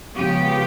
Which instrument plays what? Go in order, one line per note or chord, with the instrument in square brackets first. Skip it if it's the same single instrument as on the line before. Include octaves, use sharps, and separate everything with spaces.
[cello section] C#3 F3 G#3 B3 G4